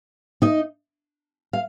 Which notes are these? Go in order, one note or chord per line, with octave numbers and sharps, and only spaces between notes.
D#4 D#5
F5